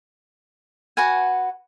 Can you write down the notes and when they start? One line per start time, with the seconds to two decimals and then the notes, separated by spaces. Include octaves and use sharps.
0.97 F#4 B4 F#5 G#5